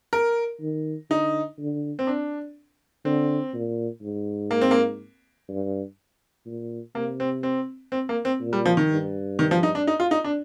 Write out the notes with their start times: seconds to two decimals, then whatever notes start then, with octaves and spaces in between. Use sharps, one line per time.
0.13 A#4
0.61 D#3
1.10 D3 D#4
1.59 D3
1.99 C4
2.07 D4
3.05 D3 C4
3.54 A#2
4.02 G#2
4.51 A#3
4.61 C4
4.71 A#3
5.49 G2
6.46 A#2
6.95 C3 A#3
7.20 C4
7.43 C4
7.92 C4
8.09 A#3
8.25 C4
8.41 A#2
8.53 G3
8.66 F3
8.77 D#3
8.89 G2
9.39 D#3
9.51 F3
9.63 D#4
9.75 D4
9.87 D#4
10.00 F4
10.11 D#4
10.24 D4